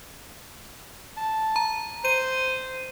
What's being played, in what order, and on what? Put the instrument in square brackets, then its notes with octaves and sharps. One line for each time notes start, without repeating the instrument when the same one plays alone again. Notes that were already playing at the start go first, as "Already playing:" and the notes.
[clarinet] A5
[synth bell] A#5
[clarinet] C5 [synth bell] D#7